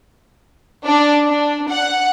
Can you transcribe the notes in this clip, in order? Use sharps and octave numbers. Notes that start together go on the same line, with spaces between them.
D4
D4
F#5